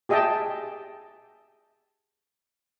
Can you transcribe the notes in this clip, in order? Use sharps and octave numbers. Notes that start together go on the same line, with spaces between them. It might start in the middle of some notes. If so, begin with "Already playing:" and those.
G4 G#4 D#5 E5 G5 A5